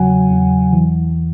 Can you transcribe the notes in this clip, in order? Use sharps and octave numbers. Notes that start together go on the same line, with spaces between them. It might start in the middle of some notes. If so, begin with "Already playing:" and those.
Already playing: E2 C#3 F#3 F#5 G#5
E2
E3